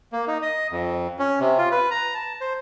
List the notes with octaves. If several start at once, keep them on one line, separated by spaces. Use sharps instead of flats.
A#3
D#4
D#5
F2
C#4
C3
F4
B4
A#5
A5
C5